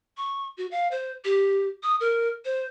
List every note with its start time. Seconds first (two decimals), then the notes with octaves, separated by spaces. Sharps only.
0.17 C#6
0.57 F#4
0.71 F5
0.91 C5
1.25 G4
1.83 D#6
2.00 A#4
2.45 C5